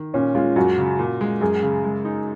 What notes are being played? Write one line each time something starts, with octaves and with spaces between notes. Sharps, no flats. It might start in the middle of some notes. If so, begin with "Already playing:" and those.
Already playing: D#3
A#2 C#4
G#3 F4
F#2 F#4
C#3
A#2
G#3
F#2 G#4
C#3
G#3
D#4